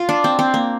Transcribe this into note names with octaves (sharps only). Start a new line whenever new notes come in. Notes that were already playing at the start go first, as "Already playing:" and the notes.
Already playing: F4
D4
C4
C4
A#3